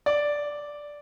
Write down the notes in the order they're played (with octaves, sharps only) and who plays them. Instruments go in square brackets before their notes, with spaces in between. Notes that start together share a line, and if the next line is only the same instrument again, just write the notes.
[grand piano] D5